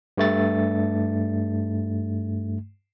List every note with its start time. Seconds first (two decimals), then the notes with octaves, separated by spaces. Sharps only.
0.17 G2 A3 A6